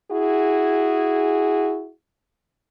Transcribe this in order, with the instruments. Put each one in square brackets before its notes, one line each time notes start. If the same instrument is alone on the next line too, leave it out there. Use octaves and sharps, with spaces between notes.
[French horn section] E4 F#4 G#4